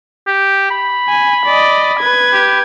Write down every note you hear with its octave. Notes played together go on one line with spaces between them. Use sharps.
G4
B5
G#5
D5 D#5
B4 G#6
G4